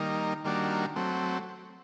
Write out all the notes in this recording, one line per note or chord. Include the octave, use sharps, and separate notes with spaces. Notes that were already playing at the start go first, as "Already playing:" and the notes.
Already playing: D#3 G3 A#3 D#4
D#3 G3 A#3 D4 F#4
F#3 A3 C4